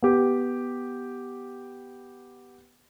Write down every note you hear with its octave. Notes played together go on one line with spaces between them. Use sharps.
B3 G4